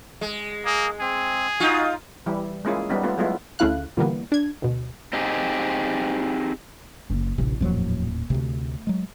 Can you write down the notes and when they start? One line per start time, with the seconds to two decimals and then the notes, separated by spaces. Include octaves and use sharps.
0.21 G#3
0.65 A#3 G#4
1.01 C4 G#4
1.60 D#4 F4 F#4
2.26 E3 G3 E4
2.65 G#3 A#3 C#4 E4 F4 G#4
2.89 G3 B3 C#4 D#4
3.03 A3 B3 F4
3.18 F#3 G#3 A3 B3 E4 F4
3.59 D2 C#3 A3 E4 F5 F#6
3.97 A#2 D3 E3 G3 A#3 B3
4.32 D4 G#6
4.62 D2 B2
5.13 C4 D#4 G4 G#4
7.10 F#1
7.38 D1 A1 C3
7.61 D#1 F2 A2 F3 F#3
8.30 D2 C3 A3
8.87 F#3 G#3